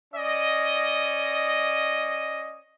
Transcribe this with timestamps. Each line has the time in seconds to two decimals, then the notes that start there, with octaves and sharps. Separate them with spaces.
0.14 C#4 D5 D#5